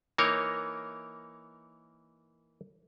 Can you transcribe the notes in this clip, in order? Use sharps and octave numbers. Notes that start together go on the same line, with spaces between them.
E3 A#3 D#4 A#4 C#5